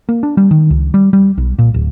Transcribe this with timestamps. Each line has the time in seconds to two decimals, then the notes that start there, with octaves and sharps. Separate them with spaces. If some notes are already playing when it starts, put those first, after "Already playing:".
0.09 A#3
0.23 D4
0.37 G3
0.51 D#3
0.70 C#2
0.94 G3
1.13 G3
1.38 B1
1.59 A#2
1.74 D1